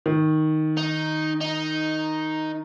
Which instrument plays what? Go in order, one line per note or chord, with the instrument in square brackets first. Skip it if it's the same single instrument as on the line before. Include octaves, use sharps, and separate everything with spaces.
[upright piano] D#3
[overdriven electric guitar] D#4
D#4